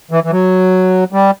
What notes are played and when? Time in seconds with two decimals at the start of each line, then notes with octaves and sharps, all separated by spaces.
0.11 E3
0.24 E3
0.31 F#3
1.13 G3